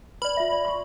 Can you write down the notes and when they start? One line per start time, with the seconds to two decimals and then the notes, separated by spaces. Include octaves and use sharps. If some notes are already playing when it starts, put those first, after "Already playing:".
0.22 B4 D5 B5
0.37 F4 E5
0.52 D5
0.65 C6 C#6